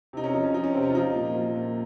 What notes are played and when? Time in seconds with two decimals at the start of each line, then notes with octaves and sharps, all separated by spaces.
0.13 C3 D#4
0.24 C#4
0.34 F3 D#4
0.44 C#4
0.54 F3 D#4
0.64 C#4
0.73 C3 C4
0.83 C#4
0.90 F4
0.95 F3 D#4
1.15 A#2
1.35 F3
1.55 A#2